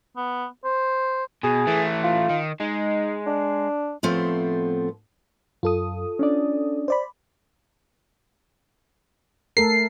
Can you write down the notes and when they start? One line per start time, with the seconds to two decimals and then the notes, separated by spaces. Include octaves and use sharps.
0.17 B3
0.64 C5
1.43 B2 G#4
1.67 E3 A3
2.03 F4
2.30 D#3
2.60 G#3 D#4
3.26 D4
4.03 A2 F3 A3 B3 C4
5.63 F#2 F4 A4 D#6
6.19 C#4 D4 D5
6.88 C5 D5 B5
9.57 A3 A4 A#4 C7